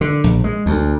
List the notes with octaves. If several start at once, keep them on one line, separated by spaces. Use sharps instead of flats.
D3
A#1
G#3
D2